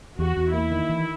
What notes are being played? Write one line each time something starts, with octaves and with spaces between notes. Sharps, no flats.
E2 F#4
E2
A#3 E4
D#3
E3